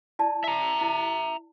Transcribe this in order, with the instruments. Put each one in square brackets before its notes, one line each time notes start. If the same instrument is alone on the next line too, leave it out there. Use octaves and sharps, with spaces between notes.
[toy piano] E4 D5 A5
[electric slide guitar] E5 A#5
[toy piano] E4